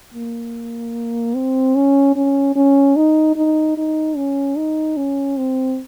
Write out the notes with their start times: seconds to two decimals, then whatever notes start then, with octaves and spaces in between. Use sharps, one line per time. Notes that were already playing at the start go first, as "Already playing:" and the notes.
0.14 A#3
1.35 C4
1.75 C#4
2.16 C#4
2.55 C#4
2.96 D#4
3.36 D#4
3.77 D#4
4.16 C#4
4.57 D#4
4.97 C#4
5.38 C4